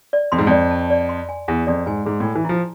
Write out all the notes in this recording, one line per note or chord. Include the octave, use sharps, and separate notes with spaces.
D5
F2 C6
G#2
F2 D5
A5
D5
C6
G#5
E2 G#5
F2 D5
G#2 G#5
G#2 G#4
A2 G#5
E3
F3 E4